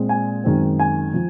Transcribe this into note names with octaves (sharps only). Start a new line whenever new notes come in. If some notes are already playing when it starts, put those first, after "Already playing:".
Already playing: A#2 G#3 C4
G#5
F#2 D#3 G#3 C4
G#5
F3